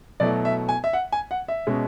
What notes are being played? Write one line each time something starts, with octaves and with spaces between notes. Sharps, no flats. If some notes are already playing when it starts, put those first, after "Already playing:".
B2 F#3 A3 E4 D5
E5
G#5
E5
F#5
G#5
F#5
E5
B2 G#3 C#4